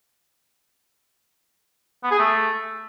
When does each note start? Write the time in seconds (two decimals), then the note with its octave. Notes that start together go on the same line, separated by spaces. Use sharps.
2.03 B3
2.11 G#4
2.19 A3